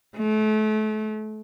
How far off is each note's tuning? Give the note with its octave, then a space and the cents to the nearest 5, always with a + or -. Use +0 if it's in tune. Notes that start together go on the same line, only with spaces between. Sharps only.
A3 -35